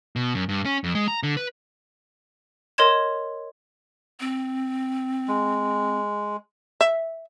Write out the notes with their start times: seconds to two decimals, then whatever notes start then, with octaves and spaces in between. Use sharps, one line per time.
0.16 B2
0.35 F#2
0.49 G2
0.65 C#4
0.84 F2
0.95 G#3
1.08 A#5
1.23 D3
1.37 B4
2.78 A#4 C#5 D#5 C6 G#6 E7
4.20 C4
5.28 G#3
6.81 E5